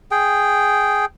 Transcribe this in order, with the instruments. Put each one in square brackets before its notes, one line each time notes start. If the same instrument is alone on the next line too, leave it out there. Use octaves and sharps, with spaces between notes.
[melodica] G#4 G5